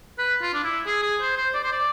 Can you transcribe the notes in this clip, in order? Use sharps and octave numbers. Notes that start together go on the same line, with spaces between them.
B4
F4
D4
E4
G#4
G#4
C5
C5
D5
C5
D5